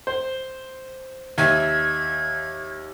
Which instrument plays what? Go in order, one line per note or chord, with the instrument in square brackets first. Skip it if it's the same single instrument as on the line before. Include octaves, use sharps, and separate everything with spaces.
[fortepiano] C5
[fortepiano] D#2 E5 [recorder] G#6